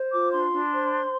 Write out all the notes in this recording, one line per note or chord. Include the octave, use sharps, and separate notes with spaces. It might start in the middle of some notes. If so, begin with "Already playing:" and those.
Already playing: C5
F4 D6
D4 C6
D4
C5